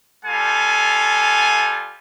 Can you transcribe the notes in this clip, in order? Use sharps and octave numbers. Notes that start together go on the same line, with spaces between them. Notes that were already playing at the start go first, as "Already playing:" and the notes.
G3 F4 A4 F5 G#5